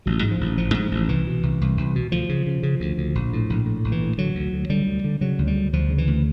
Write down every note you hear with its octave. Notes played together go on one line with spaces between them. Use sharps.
A1 F#3
G#2
F3
A1
A1 F3
G#2
A1
C2 E3
B2
C2
C2
C2
B2
D2 F3
C#3
C#3
C#3
D2
D2
A#1
A2
A#1
A2
A#1
E3
A2
D3 F#3
D2
D2
D3 G3
D2
D3
C#3 F#3
D2
G3
D2
D2 F3
C#3
E3
D2